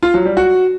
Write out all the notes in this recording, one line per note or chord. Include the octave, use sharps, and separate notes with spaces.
F4
F#3
G3
F#4